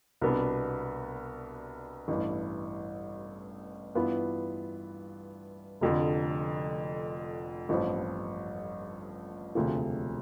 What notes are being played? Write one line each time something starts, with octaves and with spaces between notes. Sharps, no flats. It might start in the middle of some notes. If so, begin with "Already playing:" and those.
C2 B2 B3 D4
A1 G2 E3
G2 E3 B3 F4
F1 F2 D3
A1 G2 F3 C4
E1 D2 C3 F3